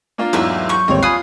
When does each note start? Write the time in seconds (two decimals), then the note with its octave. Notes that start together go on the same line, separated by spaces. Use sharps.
0.18 A#3 D4 F4
0.33 E2 G#2 F#3 A3 E5 E6
0.69 C#6 G6
0.88 A1 D#2 G3 G#3 C4 C#5
1.03 F4 G#5 B5 D#6 F#6 C7